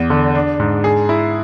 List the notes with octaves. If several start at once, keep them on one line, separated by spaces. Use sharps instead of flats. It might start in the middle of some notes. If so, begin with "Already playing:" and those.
Already playing: E2
D3
D4
G#2
G#4
E4